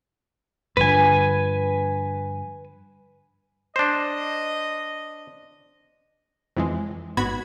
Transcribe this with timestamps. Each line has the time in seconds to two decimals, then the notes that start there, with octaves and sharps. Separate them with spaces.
0.77 G2 D3 F3 B4 G#5
3.76 D4 C5 D#5
6.56 F2 E3 G#3
7.17 G#1 B3 F#4 B5 G#6